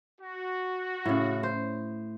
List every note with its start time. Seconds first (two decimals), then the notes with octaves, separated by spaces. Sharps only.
0.21 F#4
1.05 A2 C#3
1.43 C5